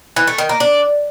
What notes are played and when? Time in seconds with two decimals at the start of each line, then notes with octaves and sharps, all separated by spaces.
0.16 E3
0.27 A3
0.38 D#3
0.49 A#3
0.60 D4